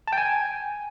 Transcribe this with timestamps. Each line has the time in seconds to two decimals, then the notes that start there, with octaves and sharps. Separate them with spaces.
0.08 A5
0.13 G5
0.18 G#5